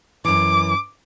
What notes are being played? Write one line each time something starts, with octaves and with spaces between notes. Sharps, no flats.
F#2 E3 D6